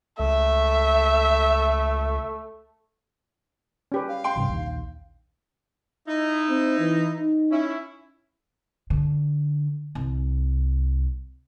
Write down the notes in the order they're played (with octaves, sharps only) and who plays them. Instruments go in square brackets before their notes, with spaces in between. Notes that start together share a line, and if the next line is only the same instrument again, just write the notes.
[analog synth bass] C#2 [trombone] A3 [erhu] E5
[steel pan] C#4 G4 B4
[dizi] F5
[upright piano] G5 C6
[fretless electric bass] G2 C3 F3
A#1 D#2
[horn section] D#4 E4
[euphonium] C4
E3
D#4
[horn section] C#4 E4
[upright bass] D3
C2